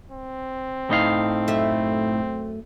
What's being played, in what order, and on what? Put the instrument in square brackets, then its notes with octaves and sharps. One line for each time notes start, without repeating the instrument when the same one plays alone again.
[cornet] C4
[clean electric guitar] A2 D#4 F5
[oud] F#2 A3 E5